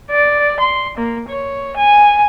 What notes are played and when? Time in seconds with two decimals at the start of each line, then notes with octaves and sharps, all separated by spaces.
0.11 D5
0.60 C6
0.98 A#3
1.29 C#5
1.77 G#5